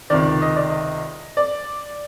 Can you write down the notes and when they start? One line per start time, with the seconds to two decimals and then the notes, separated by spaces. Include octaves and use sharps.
0.10 C#2 C3 D#3 D5
0.42 D#5
0.56 D5
0.70 D#5
1.37 D5